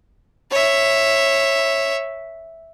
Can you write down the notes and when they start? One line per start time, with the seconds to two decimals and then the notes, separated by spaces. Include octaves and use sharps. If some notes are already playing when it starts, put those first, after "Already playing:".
0.51 C#5 E5